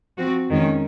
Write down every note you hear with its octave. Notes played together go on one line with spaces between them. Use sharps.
F3 C4 F#4
F2 D#3 G#3 C#4